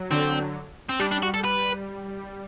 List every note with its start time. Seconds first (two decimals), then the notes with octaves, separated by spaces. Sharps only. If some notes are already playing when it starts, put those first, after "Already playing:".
Already playing: F#3
0.11 D3 C4
0.89 C4
1.00 G3 D4
1.11 D4
1.23 F#4
1.34 A4
1.45 B4